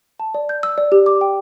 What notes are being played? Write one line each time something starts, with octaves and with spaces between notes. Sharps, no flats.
A5
D5
G6
E6
D5
G4
D6
G5